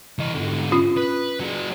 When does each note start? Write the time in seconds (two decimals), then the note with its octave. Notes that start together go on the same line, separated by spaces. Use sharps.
0.19 E3 D#5
0.34 G#2 D3
0.72 C#4 F4
0.98 B4
1.40 F#3 G#4